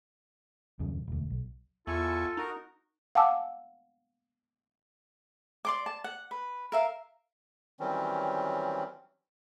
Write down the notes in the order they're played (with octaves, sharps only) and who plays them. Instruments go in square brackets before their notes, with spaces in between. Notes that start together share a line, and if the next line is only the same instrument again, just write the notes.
[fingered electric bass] D#1 F#2 C#3
E1 D2
B1
[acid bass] E2 [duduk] F4 [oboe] A4 [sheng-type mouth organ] E5 G#5 C#6
[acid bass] D#4 [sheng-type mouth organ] F#4 A#4
[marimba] F5 F#5 G#5 A5 D6 E6
[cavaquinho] D5 C6 D6
A5
F#5
B4
A#4 E5 F5
[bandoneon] D#3 E3 F#3 G3 C4 C#4